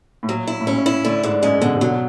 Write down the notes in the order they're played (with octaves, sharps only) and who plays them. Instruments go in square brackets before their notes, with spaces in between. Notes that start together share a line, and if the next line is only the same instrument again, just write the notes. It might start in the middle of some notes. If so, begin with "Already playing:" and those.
[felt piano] A2
[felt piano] A#2 [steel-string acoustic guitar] F#3
[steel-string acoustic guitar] E4
[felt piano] A2
[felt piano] A#2 [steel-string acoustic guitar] C#4
[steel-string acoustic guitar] E4
[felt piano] A2 [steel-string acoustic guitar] D3
[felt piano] G#2 [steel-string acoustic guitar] D3
[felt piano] F#2 [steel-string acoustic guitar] G#3
[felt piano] B2 [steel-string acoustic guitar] D3
[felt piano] C3
[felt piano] B2 [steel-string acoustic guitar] F#3